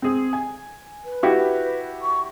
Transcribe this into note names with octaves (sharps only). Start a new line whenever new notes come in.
C4 G#4
G#5
B4
E4 F#4 G4
C#6